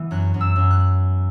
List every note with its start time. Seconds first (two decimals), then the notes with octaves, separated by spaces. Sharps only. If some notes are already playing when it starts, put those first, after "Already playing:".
Already playing: E3 B3
0.11 F#2 F#6
0.34 F#2
0.41 E6
0.56 F#2
0.71 F#6